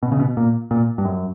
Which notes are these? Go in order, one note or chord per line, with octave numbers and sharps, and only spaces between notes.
B2
C#3
B2
A#2
A#2
G2
F#2